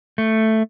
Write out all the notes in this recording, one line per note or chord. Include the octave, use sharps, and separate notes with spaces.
A3